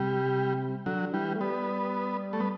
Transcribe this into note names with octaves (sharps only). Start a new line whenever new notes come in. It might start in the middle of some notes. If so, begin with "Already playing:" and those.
Already playing: C3 G3
D3 F#3
E3 G3
A3
G3 B3
A3
B3